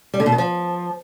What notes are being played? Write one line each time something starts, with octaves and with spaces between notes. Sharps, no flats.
G3
D3
B2
D#3
F3